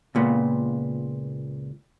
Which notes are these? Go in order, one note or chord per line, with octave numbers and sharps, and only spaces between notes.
C#2 A#2 B3